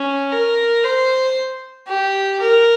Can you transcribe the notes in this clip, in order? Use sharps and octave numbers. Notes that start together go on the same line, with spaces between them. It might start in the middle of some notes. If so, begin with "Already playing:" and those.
Already playing: C#4
A#4
C5
G4
A#4